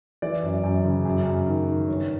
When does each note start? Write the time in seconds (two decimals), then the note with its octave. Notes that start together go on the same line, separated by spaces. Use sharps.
0.22 E3 D5
0.43 F#2
0.63 F#2
0.85 C#3
1.05 F#2
1.26 F#2
1.47 D#3
1.67 D#3
1.88 G2 C#5